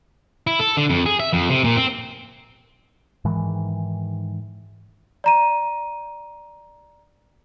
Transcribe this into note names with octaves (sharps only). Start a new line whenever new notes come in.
E4
A4
D3
F2
G#4
E5
F2
C3
A#2
C4
G#2 D#3 E3 G#3
D5 A#5 D#7